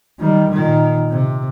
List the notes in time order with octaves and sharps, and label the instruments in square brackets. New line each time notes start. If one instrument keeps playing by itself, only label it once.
[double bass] D#3 G3
A#2 D#3
C3